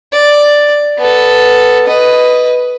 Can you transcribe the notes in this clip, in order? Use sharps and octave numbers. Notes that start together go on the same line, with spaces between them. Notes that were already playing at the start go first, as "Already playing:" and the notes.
D5
B3 A4
B4 D#5